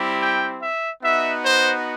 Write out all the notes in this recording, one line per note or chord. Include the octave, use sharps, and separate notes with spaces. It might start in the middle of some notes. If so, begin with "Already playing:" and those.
Already playing: G3 C4 E4 G4
G5
E5
B3 D#4 F#4 E5
C5